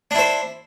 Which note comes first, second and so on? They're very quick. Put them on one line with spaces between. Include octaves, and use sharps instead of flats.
D4 E4 C5